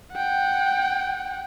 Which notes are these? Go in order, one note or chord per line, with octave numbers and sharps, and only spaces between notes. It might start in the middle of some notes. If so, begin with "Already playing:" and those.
F#5 G5